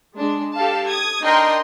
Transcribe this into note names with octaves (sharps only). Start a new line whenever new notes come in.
G#3 D4
G4 A4 F5 A5
D#6 G#6
D4 D#4 A#4 D#5 G5 C6